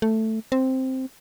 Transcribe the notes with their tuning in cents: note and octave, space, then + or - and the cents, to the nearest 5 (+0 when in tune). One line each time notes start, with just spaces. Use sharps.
A3 +5
C4 +0